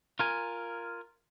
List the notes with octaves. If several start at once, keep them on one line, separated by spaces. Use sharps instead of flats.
F4 A#4 G#5